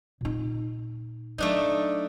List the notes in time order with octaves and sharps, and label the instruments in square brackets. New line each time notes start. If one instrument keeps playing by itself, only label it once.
[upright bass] A#2 D#4
[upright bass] F#3 [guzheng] A3 D4 D#4